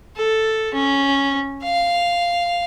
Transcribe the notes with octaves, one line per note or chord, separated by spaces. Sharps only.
A4
C#4
F5